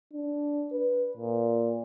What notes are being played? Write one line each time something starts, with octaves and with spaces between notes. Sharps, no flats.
D4
B4
A#2